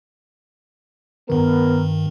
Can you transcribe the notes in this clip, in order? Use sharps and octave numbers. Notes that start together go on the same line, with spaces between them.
G2 D#3 B3 A#4